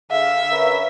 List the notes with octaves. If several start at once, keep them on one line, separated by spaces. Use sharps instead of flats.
D3 G#4 E5 F5
C#4 A#4 B4